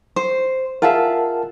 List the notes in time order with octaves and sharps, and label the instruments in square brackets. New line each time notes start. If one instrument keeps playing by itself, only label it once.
[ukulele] C5
[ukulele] F4 G#4 E5 [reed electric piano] A#4 F#5 A5